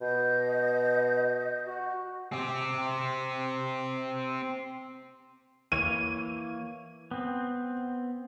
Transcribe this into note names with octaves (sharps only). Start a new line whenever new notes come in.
B2 D#5 G6
F#4
C4 G4
E3 A#3 C#5 D#7
B3 C4